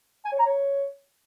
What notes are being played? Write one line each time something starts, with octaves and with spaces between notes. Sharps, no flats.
G#5
C#5
A#5
C#5